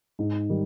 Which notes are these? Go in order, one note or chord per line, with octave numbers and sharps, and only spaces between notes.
G#2
D#3 G3